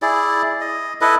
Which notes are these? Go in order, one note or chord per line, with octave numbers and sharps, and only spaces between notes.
E4 G#4 D5
D#5
E4 A4 B4 D#5